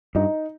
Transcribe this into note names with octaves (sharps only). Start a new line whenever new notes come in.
G2 D#4